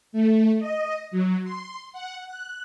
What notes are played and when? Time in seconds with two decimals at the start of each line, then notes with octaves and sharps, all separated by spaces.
0.12 A3
0.59 D#5
1.11 F#3
1.44 C6
1.93 F#5
2.26 F#6